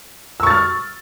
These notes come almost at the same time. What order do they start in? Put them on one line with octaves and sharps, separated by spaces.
E6 C#6 A6 F6